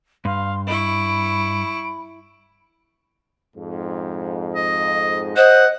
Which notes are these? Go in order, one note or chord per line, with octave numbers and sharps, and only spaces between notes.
G2 F5 C6
E4 B5 C#6 D7
F2 G#2
D#5
C5 D#5 F#5